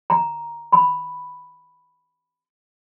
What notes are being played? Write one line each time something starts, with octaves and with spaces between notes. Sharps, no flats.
A#5
B5